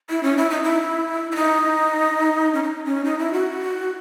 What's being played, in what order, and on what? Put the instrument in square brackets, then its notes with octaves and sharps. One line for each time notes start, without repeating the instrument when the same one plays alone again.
[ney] E4
C#4
E4
D#4
E4
E4
D#4
C#4
D#4
C#4
D#4
E4
F#4